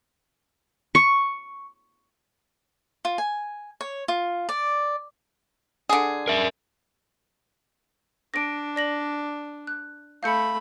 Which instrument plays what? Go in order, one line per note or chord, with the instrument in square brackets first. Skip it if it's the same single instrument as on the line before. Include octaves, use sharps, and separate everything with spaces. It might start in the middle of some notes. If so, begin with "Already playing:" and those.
[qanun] C#6
[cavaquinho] F4
G#5
C#5
F4
D5
[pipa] D3 G#4
[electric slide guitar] A#4 E5
[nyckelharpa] D4 [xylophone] A#6 D7
[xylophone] D5 A#6 F#7
F#6
[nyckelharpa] A3 B5 [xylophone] F5 G6 C#7